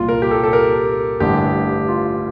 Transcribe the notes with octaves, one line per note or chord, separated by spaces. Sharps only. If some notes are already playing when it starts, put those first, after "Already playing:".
Already playing: C2 A#2 F4
A#4
G4
A4
A4
A#4
A1 G2 D3 G4
F4